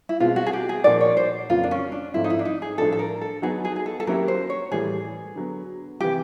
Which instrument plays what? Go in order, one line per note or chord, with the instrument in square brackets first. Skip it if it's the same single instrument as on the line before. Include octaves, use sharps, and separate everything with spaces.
[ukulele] E4
[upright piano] B2 G#3 C4 [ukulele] F4
[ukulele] F#4
G#4
G4
G#4
[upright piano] A#2 F3 A#3 D#4 F#4 [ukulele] D5
[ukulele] C#5
C5
[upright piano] F2 C#3 F#3 A#3 [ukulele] F4
[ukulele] D4
C#4
D4
[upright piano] G#2 F3 A3 C4 F4 [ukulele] E4
[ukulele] D#4
E4
D4
D#4
G#4
[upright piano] A2 F3 A3 D4 [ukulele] A4
[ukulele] A4
A#4
A4
[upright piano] F#3 B3 D#4 F#4 [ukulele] G#4
[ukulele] G#4
G#4
A4
A4
[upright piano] F#3 A#3 C#4 E4 G4 [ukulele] A#4
[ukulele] C5
C#5
[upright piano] A2 E3 G3 [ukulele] G#4
[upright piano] D3 F#3 B3
[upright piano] C3 E3 [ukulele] G4